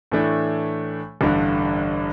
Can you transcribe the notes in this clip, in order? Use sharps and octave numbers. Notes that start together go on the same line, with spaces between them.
A2 E3 A3 D4
A1 G2 D3